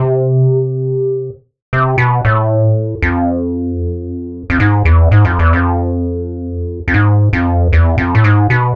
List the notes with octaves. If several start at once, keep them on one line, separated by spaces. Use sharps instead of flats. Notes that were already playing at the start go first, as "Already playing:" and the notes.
Already playing: C3
C3
B2
A2
F2
F2
G#2
E2
G#2
F2
E2
F2
F2
G#2
F2
E2
F2
A2
G#2
B2